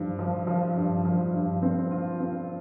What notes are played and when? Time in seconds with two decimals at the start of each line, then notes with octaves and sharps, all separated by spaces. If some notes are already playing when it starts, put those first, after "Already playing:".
Already playing: G2 F3
0.19 F3
0.47 F3
0.76 G2
1.05 F3
1.33 G2
1.62 C4
1.91 F4
2.20 C4